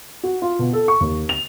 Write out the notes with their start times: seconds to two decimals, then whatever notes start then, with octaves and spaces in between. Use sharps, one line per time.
0.23 F#4
0.42 F4
0.59 B2
0.73 A4
0.88 C#6
1.00 D#2
1.29 F7